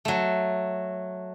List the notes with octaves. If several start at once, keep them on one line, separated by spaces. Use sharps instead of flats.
F#3 A3